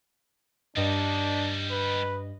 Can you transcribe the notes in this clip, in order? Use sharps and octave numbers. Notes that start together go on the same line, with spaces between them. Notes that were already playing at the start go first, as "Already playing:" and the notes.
G2 G3 D4 D#4 D#5
B4